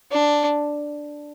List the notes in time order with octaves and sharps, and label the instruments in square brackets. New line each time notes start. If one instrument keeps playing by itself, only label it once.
[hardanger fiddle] D4